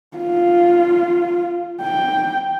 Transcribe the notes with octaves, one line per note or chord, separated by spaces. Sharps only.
F4
G5